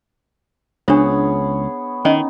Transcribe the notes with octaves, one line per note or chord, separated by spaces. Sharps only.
C#2 B3 D4 G#4 C5 C#5
D#3 C#4 D#4 D#5